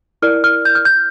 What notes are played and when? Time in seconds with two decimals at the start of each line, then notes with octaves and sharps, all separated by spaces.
0.22 E4 A#4 D5 F6
0.44 F6
0.65 G6
0.75 F6
0.85 G6